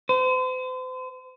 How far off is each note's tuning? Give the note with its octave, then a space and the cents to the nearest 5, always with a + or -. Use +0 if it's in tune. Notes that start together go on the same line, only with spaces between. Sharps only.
C5 -40